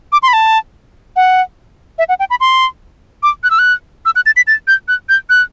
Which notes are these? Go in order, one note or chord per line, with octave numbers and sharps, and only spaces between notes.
D6
C6
B5
A5
F#5
E5
F#5
G5
B5
C6
D6
F#6
E6
F#6
E6
F#6
A6
B6
A6
G6
F#6
G6
F#6